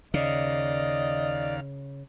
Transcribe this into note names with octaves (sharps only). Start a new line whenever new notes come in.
D#2 C#3 D5 D#5 F5